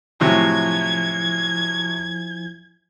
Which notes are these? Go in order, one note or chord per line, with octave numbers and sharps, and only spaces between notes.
A2 C3 F3 F#3 E4 G#5 G#6